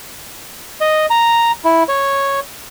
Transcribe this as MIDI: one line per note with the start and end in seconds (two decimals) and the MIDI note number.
0.81 1.06 75
1.10 1.52 82
1.65 1.83 64
1.89 2.40 73